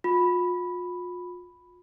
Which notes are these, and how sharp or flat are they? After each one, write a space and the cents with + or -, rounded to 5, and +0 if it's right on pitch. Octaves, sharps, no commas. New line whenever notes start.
F4 +40 B5 +0